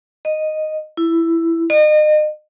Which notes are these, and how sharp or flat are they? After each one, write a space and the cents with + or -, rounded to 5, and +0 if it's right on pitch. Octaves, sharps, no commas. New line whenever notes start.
D#5 -5
E4 +10
D#5 -35